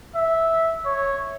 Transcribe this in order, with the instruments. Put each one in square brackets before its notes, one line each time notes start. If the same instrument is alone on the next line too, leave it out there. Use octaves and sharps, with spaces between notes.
[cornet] E5
C#5